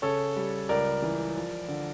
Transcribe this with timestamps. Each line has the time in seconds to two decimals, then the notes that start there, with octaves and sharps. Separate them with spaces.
0.02 C#3 A4 C#5
0.36 G3
0.69 C#2 A#4 D5
1.02 E3
1.35 F3
1.68 D3